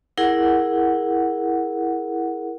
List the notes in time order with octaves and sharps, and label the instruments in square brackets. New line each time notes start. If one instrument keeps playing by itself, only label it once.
[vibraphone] E4 G#4 A#4 F#5